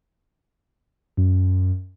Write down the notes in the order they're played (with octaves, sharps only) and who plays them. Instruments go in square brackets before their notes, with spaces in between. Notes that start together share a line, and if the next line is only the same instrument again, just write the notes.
[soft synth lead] F#2